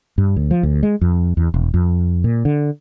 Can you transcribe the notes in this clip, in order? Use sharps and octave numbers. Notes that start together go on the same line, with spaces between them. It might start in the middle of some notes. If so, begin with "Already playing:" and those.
G2
D2
F3
D2
G#3
F2
E2
E1
F2
A#2
D3